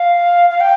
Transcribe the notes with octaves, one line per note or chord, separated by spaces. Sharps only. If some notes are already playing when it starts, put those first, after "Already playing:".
Already playing: F5
F5
G5